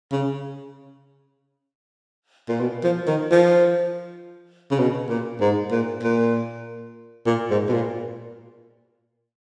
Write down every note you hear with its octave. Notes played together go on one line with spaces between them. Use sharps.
C#3
A#2
B2
F3
D#3
F3
C#3
B2
A#2
G#2
A#2
A#2
A#2
G#2
B2
A#2